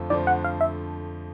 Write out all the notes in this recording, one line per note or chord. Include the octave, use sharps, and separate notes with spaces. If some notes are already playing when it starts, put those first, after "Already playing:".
Already playing: F2 D3 F3 A3
F2 D3 F3 A3 D5
F#5
F5
E5